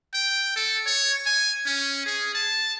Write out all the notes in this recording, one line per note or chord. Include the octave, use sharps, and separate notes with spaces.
G5
A4
C#5
G#5
C#4
G#4
A5